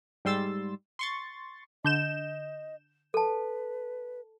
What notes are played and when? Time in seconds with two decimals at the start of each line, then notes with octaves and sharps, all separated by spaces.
0.25 G#2 G3 C6 E6 A6
0.99 C6 C#6 A6
1.84 D3 D#5 G6 E7
3.14 A4 B4 A5